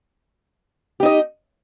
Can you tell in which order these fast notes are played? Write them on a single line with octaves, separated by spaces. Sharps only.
G4 D#4 D#5